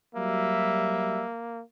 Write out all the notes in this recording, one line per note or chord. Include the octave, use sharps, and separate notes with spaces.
F#3 G3 A#3 E5